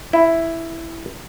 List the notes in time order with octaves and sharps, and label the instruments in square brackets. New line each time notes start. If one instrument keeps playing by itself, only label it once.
[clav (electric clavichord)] E4